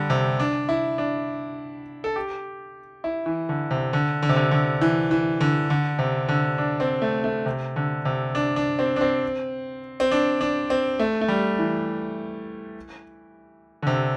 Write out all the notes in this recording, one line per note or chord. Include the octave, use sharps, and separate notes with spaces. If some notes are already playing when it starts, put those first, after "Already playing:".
Already playing: D3 G3
C3
D4
E4
D4
A4
G4
E4
E3
D3
C3
D3
D3
C3
D3
D3
E3
E3
D3
D3
C3
D3
D4
C4
A3
A3
C3
D3
C3
D4
D4
C4
D4
C4
C4
D4
D4
C4
A3
A3
G3
E3
D3
C3